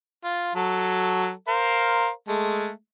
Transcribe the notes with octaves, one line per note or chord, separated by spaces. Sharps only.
F4
F#3 A4
A#4 C5 F5
G#3 A3